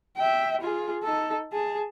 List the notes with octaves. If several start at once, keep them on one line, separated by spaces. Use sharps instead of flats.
E5 G5
F4 G#4
D#4 A4
G#4 A5